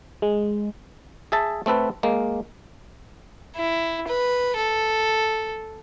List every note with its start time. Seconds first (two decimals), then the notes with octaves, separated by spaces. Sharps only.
0.22 G#3
1.32 G#4 E5 A5
1.66 A3 C4 A4 B4
2.03 G#3 A#3
3.56 E4
4.08 B4
4.56 A4